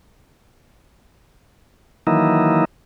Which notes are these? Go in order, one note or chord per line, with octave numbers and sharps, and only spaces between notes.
D#3 E3 F#3 A#3 D#4 E4